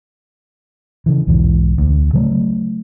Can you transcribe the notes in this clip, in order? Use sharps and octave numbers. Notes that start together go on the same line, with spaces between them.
C#3 E3
B1 E2 G#2 E3
D2
C#3 F#3 A3